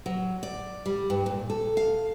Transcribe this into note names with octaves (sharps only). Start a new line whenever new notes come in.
F#3
D5
G3
G2
A#2
A4
F5